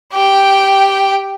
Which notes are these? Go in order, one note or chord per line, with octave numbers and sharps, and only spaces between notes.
G4 G5